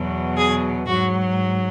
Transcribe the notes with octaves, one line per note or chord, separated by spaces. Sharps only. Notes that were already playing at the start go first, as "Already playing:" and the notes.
Already playing: E2 B2 F#3
G#4
G#2 F#3 F#4